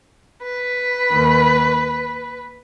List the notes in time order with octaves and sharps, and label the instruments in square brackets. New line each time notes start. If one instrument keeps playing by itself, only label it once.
[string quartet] B4
D#2 D#3